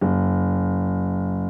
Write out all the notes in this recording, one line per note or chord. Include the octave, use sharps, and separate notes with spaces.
F#1